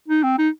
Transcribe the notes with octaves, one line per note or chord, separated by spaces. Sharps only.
D#4
C4
D#4